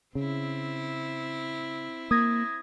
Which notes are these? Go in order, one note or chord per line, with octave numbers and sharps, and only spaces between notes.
C#3 C4 E4
A#3 D#6 G#6 A#6